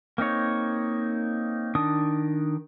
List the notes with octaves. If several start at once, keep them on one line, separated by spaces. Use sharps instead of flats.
A#3 C4 D#4 C#5
D#3 D4 D#6